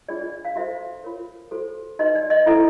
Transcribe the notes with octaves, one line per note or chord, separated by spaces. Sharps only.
D4 F4 G#4 C#5 D5
D5
F5
F#4 A4 C5 E5
F4 A#4 C#5
F#4 A4 C5
D#4 F#4 B4 D#5
D5
D#5
C#4 E4 A4 C5 E5